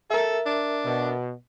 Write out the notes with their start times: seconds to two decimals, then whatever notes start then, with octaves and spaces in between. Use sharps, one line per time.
0.11 A4 A#4 E5
0.46 D4
0.85 B2